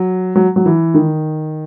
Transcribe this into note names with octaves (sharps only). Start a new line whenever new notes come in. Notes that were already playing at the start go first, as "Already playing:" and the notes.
Already playing: F#3
F#3
F#3
E3
D#3